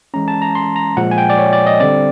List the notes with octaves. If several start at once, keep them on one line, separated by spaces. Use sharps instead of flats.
E3 G#3 C#4 A#5
A5
A#5
C6
A#5
A#2 F3 G#3 F#5
G#5
G5
D5
C#5
D5
D#5
D3 G3 C4 D5